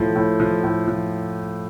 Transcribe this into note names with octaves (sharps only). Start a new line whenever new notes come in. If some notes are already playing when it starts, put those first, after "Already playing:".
Already playing: A2 F3 A3
A2
F3
A2
F3